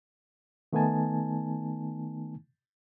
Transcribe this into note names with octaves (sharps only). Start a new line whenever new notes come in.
D#3 A3 B3 D#4 G#5 A5